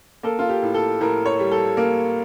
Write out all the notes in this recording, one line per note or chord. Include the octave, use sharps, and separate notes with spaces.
A#3 A4
F4
G4
A2
A4
A2 A#4
C#5
G3
A4
A#3